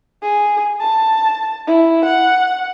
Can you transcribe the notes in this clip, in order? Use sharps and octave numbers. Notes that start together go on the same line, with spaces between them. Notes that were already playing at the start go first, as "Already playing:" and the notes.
G#4
A5
E4
F#5